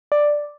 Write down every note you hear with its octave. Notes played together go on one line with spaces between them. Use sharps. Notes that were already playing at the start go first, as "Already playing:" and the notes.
D5